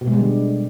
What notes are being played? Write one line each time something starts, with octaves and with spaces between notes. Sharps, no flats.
B2
G#3
G3
D3